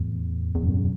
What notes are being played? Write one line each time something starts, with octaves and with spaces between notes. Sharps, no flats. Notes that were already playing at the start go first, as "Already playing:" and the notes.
Already playing: E2 A2
E2
F#2 B2